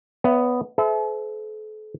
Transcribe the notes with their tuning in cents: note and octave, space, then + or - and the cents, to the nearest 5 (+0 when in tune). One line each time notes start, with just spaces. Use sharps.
B3 +5 C#5 +40 E5 +35
A4 -40 C5 -40 E5 +0